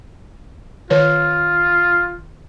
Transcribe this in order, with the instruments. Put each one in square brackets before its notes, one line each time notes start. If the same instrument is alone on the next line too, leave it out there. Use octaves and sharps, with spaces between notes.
[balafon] D#3 B4 C#5 [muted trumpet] F4